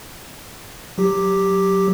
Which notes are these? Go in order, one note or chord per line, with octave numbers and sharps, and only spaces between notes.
F#3 G4